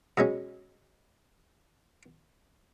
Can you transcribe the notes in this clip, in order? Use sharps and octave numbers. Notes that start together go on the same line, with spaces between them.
B2 G#3 C#4